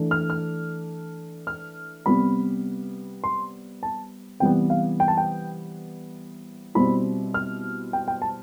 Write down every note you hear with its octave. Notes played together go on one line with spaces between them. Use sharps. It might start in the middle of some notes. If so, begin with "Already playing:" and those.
Already playing: E3 A3 D4
F6
F6
F6
C3 G3 B3 B5
C6
A5
C3 E3 G3 B3 G5
F5
G5
A5
G5
B2 G3 C4 E4 B5
F6
G5
G5
A5